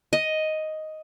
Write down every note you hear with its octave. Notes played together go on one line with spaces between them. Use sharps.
D#5